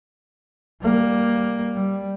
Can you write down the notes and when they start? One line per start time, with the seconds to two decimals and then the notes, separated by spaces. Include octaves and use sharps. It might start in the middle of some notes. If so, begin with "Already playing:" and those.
0.81 G3 A#3
1.75 G3